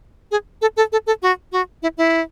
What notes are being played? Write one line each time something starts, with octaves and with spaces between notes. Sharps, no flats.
G#4
A4
A4
A4
A4
F#4
F#4
E4
E4